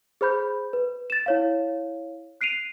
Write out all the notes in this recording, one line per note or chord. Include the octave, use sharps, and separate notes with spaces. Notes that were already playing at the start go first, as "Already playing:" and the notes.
G#4 C5 B5 G6
B4
A6 E7
E4 C#5 F5
F#6 C7 D7 D#7 F7